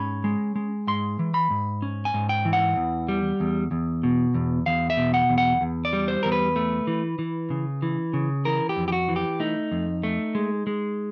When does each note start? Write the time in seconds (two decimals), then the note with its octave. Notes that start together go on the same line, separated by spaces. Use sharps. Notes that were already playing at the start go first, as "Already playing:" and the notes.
Already playing: G#2 C#4 B5
0.24 G#3
0.56 G#3
0.87 G#2 C6
1.19 E3
1.34 B5
1.50 G#2
1.82 C#4
2.05 G#5
2.14 G#2
2.29 G5
2.45 E3
2.53 F#5
2.76 E2
3.08 G3
3.40 E2
3.71 E2
4.03 B2
4.35 E2
4.66 E2 F5
4.90 E5
4.97 B2
5.14 F#5
5.29 E2
5.38 F#5
5.61 E2
5.85 D5
5.93 G3
6.08 C5
6.23 E2 A#4
6.32 B4
6.56 A3
6.87 E3
7.19 E3
7.50 C#3
7.82 E3
8.13 C#3
8.45 E3 A#4
8.69 G4
8.77 F2
8.88 G4
8.92 F#4
9.08 E3
9.16 G4
9.40 A3 D#4
9.72 F2
10.03 A3
10.35 G#3
10.67 G#3